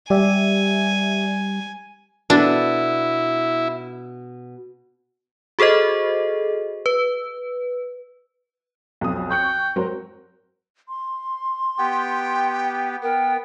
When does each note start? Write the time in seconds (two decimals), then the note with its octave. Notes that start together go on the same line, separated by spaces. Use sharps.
0.10 G3 G4 D5 E5 G#5
2.30 B2 D4 E4 A4 B4
5.59 F#4 G#4 A4 C5 D#5
6.86 B4
9.01 B1 F2 D#6
9.31 G5 C#6 F#6 C#7
9.76 F#3 A#4 C5
10.88 C6
11.78 B3 G4 G5
13.03 B3 A#4 G5